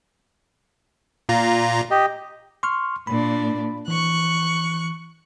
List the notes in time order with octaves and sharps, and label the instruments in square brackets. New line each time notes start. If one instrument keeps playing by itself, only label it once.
[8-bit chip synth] A#2 F4 A#5
[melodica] G4 D#5
[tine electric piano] C6 C#6 F6
[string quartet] A#2 D4 [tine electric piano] B5
[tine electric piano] E3 [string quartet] C#6 F#6